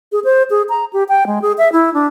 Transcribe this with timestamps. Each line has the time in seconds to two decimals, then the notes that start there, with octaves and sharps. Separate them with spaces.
0.12 G#4
0.24 C5
0.50 G#4
0.69 A#5
0.93 G4
1.09 G5
1.27 G#3
1.42 G#4
1.58 E5
1.72 E4
1.94 D4